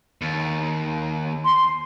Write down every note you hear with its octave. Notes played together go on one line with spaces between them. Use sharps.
D#2
C6